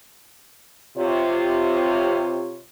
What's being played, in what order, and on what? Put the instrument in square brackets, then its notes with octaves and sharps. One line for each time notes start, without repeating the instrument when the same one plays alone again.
[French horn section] C3 F4 C#5